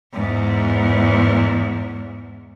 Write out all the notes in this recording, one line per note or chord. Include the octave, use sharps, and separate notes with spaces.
E2 G#2